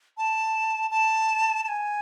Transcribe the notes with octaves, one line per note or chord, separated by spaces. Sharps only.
A5
A5
A5
G#5